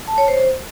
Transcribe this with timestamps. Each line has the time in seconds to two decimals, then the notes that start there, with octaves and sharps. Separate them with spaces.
0.08 A5
0.18 C#5
0.28 C5